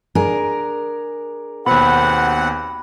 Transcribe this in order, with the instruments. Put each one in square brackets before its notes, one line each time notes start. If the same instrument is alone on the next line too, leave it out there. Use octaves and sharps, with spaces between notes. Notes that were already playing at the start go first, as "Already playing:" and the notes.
[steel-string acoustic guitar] D4 G#4 A#4
[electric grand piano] D#2 B2 [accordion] C4 F#5 [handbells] B5